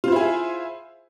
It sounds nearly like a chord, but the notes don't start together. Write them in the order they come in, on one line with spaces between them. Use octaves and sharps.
F4 C5 E4 G#4 E5